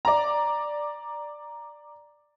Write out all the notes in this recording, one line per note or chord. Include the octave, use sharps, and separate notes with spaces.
D5 A#5